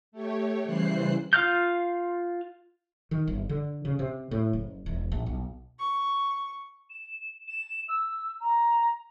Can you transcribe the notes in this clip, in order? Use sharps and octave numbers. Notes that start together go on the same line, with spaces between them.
A3 G4 C#5
C#3 E3 G3 C5 F#6 C7
F4 F5 F6 G6
D#3
G1
D3
C#3
C3
A2
F#1
E1
A#1
B1
C#6
E7
E7
E6
A#5